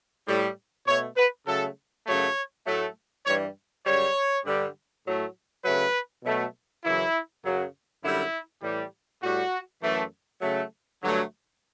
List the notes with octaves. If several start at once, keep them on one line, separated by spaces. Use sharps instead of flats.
A2 G3
B2 A3 C#5
B4
C#3 F#3 A3 A4
F#2 C#3 F#3 A3 C#5
A2 F#3 A3
G2 E3 G3 C#5
F#2 C#3 G3 C#5
G2 D3 G3
A2 F#3 A3
C#3 F#3 A3 B4
B2 F#3 A3
F#2 C#3 E3 E4
F#2 C#3 F#3
F#2 D3 G3 E4
A2 E3 G3
A2 G3 F#4
F#2 E3 A3
C#3 F#3 A3
G2 D3 F#3 A3